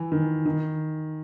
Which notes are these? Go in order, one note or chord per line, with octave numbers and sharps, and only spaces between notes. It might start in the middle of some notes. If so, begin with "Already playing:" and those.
Already playing: E3
D#3
D#3